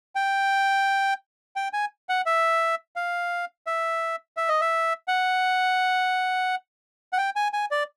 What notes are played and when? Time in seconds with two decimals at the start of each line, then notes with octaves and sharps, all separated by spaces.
0.15 G5
1.56 G5
1.73 G#5
2.09 F#5
2.26 E5
2.96 F5
3.67 E5
4.37 E5
4.49 D#5
4.61 E5
5.08 F#5
7.13 F#5
7.18 G5
7.36 G#5
7.53 G#5
7.71 D5